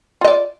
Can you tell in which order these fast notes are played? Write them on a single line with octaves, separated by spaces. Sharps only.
F4 D#5 D5